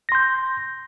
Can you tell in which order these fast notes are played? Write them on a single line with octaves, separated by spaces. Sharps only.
A#6 C6 G6